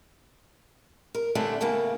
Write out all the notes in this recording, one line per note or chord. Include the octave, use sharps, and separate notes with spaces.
A#4
D3 G3 A3 C#4 D4 G4
E2 A2 C#3 A#3 B3